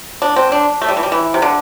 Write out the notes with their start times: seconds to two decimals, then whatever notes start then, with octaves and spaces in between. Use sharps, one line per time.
0.22 D4
0.36 C4
0.52 D4
0.82 A3
0.88 G3
0.97 E3
1.03 G3
1.12 E3
1.34 C3
1.42 D3